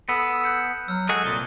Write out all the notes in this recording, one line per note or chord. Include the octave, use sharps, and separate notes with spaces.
B3 A4 D#6 E6
F#6 G6 C#7
F#3 E6 F6
G#3 F#4 G#4 A4 F#6
C2 A#2 D#6 G#6 G7